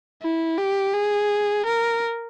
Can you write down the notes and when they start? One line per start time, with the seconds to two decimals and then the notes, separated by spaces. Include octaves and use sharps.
0.23 E4
0.58 G4
0.94 G#4
1.66 A#4